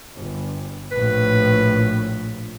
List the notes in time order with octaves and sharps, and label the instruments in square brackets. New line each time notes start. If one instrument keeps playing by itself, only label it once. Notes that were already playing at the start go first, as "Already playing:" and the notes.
[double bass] G1
[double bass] A#1 A2 [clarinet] B4